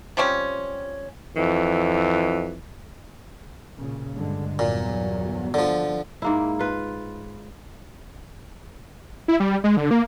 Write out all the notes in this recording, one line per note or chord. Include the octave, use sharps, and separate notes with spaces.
F3 G3 C4 C#4
F2 E3
A#2 C#3
G2 D3 G#3
G1 E2 A#2 F#3
D3 F3
G#2 A#3 E4
F4 B4
E4
G3
G#3
D3
A#3